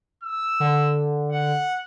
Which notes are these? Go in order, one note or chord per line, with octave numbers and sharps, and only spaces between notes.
E6
D3
F#5